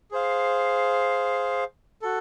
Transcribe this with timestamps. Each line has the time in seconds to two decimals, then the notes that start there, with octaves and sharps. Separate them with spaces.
0.11 G#4 C5 F5
2.02 F#4 A4